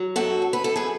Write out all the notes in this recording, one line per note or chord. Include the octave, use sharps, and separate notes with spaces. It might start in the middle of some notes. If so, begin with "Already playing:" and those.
Already playing: F#3
F#2 F#4 A4
F#2
B4
F#2 A4
G#4 B4